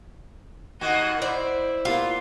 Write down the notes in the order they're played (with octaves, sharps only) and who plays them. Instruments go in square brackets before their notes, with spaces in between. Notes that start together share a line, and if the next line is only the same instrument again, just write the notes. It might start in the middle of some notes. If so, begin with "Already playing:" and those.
[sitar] D#2 A#3 F#4 [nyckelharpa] D#5 F#5
[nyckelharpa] E4 [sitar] C5 [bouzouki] D5
[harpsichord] G3 A#3 B3 [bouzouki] F4